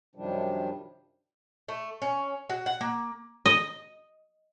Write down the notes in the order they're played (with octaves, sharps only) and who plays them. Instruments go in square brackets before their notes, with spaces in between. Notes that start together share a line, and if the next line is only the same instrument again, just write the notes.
[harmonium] F#2 C3 D#3 F3 G3 D4
[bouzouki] A3
C#4
F#4
F#5
A#3
[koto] D#5